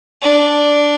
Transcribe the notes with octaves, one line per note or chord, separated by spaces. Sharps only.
D4